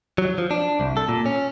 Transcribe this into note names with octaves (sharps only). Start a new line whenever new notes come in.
F#3
F3
D4
C2
A4
A#2
C#4